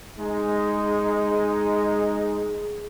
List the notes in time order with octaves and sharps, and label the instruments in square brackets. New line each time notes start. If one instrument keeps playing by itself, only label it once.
[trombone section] G#3 D#4 [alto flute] G#4